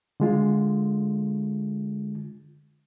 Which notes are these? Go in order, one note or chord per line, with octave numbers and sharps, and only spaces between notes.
D3 G#3 F4